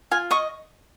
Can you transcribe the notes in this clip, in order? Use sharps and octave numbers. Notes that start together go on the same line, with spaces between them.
F4 G#5
D#5 C#6